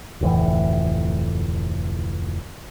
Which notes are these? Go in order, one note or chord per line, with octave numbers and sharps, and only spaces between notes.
F1 D2 A2 E3